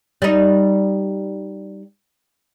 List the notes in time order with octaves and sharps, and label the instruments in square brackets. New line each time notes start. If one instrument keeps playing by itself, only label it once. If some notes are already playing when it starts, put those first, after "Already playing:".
[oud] G3 D#4